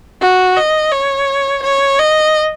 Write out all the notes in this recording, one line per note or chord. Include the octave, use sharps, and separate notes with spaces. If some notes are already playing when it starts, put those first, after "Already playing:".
F#4
D#5
C#5
C#5
D#5